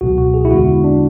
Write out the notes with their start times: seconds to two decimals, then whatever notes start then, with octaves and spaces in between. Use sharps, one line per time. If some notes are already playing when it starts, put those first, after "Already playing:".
0.01 C#2 B2 F#3 F#4
0.18 F#4
0.34 G#4
0.45 E4
0.51 E2 D3 G#3 B3 F#4
0.68 E4
0.84 D4